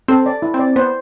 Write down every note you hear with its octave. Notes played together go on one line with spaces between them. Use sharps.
C4 A4
D5
E4
C4
D5
B3 C5